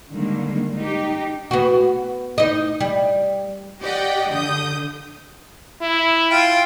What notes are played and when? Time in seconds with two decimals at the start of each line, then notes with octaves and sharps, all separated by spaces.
0.10 D3 D#3 G3 G#3 A#3
0.76 D#4 G4
1.51 B3 F#4
2.38 D#4 D#5
2.81 G3
3.82 G4 D5 D#5 F#5 G5
4.32 D3 D#6 G6
5.81 E4
6.30 F4 G5